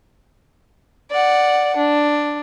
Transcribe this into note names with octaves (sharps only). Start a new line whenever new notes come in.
D5 F#5
D4